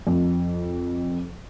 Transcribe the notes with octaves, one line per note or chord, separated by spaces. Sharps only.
F2